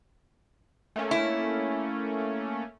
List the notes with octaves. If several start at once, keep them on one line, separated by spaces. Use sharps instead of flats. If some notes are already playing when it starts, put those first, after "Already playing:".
A3 A#3 C#4
E4